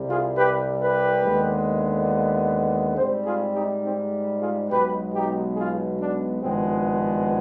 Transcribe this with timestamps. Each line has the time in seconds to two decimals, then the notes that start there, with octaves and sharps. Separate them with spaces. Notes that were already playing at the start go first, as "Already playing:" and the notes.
Already playing: C2 C3 G3
0.09 F4 G#4
0.37 G4 B4
0.81 G4 B4
1.23 D#2 D3 G#3 B3
2.96 G#2 G3 C4 G#4 C5
3.26 F4 G#4
3.54 D#4 G4
3.83 C4 D#4
4.41 F4 G#4
4.70 B1 B2 G#3 B3 G4 B4
5.13 D#4 G4
5.56 F4 G#4
6.00 D4
6.43 G#1 G2 F3 G#3 B3 C4